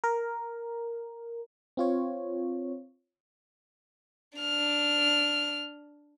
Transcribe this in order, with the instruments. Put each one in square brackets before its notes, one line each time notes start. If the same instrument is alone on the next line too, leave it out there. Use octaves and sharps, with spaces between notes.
[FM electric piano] A#4
C4 F4 C#5
[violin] D4 F6